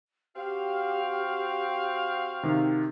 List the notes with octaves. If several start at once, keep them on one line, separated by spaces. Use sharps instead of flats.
C4 F#4 G4 F5
C3 D#3